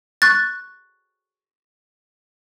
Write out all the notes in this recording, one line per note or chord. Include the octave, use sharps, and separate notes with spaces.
C#6 F#6 A6